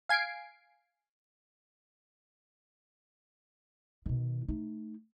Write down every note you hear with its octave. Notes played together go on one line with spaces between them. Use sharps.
F5 G#5 G#6 C7 D7
B2 D#3
A3 D#4